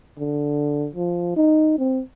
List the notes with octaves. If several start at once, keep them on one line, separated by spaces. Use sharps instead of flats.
D3
F3
D#4
C4